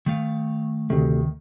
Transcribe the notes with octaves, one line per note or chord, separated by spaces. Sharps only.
D#3 A3 F5
D2 C3 D#3 A3